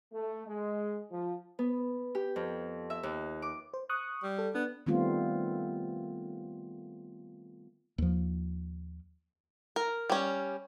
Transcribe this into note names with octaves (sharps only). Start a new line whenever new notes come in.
A3
G#3
F3
B3
G4
F2
E5
D#2
D6
C5
C#6 D#6 F#6
G3
A4
B3 D4
D#3 G3 A3 B3 C4 F4
D#2 F3
A#4
G3 C#4